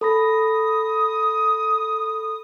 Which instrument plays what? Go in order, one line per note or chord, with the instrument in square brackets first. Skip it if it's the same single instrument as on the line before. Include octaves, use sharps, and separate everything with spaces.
[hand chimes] A4 B5 A#6 [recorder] D#6